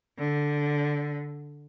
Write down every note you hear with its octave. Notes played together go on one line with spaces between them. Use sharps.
D3